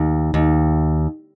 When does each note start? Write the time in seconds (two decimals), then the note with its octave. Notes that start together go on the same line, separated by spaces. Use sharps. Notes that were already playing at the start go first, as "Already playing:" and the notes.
Already playing: D#2
0.34 D#2